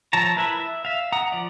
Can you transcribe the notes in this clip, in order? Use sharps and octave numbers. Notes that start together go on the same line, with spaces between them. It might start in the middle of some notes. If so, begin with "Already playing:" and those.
F3 E4 C#5 A5 A#5
E4 A#4 B4 E5 A5
E5
E5 F5
F#5 A#5 D#6
F3 D5